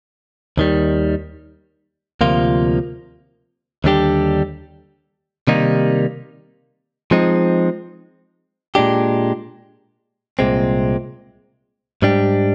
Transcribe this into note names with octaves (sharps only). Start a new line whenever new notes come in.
D#2 D#3 G3
D2 C3 F3 A#3 F4
D#2 D3 G3 D4 G4
C3 D#3 G3 A#3 D#4
F3 G#3 C4 D#4
A#2 G#3 D4 G4
C2 A#2 G#3 C4
G#2 G3 D4 G4